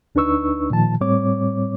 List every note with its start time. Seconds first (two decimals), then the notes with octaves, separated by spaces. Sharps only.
0.15 D2 D4 D#4 B4 C#6 E6
0.70 A#2 D#3 F3 A5
1.01 A2 G3 C4 C#5 D6